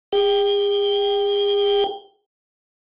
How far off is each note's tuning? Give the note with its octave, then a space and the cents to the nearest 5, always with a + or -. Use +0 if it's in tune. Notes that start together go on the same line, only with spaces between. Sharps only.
G#4 -40 G5 +0